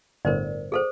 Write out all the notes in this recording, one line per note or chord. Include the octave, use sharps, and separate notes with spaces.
G1 A2 A#4 C5 D5
G#4 A4 C5